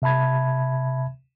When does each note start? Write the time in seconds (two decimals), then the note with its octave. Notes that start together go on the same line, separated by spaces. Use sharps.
0.02 C3 E5 A5 B5 G#6